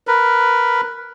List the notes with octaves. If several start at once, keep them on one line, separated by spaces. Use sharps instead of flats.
A#4 B4